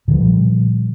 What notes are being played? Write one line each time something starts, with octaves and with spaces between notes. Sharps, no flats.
A#2 D3 F3 G3